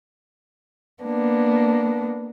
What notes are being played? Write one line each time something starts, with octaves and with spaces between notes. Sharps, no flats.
A#3 B3 D4